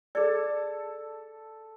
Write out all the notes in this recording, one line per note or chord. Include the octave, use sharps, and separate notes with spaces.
G#4 A4 D5